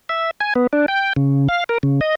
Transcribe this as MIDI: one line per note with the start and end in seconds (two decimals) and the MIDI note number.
0.09 0.31 76
0.40 0.53 80
0.55 0.67 59
0.73 0.86 62
0.88 1.13 79
1.16 1.48 49
1.49 1.64 77
1.69 1.78 70
1.83 2.00 49
2.01 2.15 75